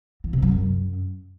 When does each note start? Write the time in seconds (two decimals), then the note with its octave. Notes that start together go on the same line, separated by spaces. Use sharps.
0.24 E3
0.33 C3
0.42 F#3
0.52 F#2